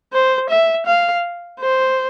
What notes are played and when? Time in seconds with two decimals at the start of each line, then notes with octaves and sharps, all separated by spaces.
0.13 C5
0.50 E5
0.86 F5
1.60 C5